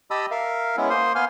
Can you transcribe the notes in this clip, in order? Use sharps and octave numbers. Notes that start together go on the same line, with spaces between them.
G4 D#5 A5 B5 D#6 E6
A#4 E5 F5
G#3 B3 C#4 E4
A#3 C5 C6 D#6
B3 F5 G#5 C6 F6